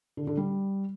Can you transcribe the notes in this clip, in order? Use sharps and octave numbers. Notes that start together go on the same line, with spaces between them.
D3
D3
G3